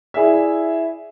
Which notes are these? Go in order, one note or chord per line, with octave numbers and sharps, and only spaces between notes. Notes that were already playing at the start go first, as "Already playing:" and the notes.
E4 G#4 D5 E5